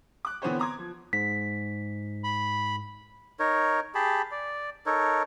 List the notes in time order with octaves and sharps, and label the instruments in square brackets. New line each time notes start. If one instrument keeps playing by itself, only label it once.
[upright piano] D6 F#6
D3 E3 B3 C4 C5 C#5
A#5 C6 D6 D#6 G#6
F3
[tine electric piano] G#2 [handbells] B6
[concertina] B5
[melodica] D#4 A#4 C#5
G4 G#4 A5 B5
D5
D#4 A4 A#4 C#5